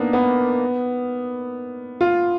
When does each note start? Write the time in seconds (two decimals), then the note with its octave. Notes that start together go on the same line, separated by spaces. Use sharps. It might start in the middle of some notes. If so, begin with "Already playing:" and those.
Already playing: A#3 B3 D4 D#4
0.13 B3
2.01 F4